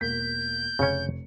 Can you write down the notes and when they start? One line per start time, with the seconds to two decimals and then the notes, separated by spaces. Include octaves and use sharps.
0.01 E1 A#3 G6 B6
0.79 F1 C#3 C#4 C#5 C#7